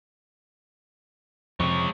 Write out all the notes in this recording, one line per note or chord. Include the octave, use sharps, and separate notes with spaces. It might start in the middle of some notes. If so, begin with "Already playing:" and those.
F2 C3 G#3 C#5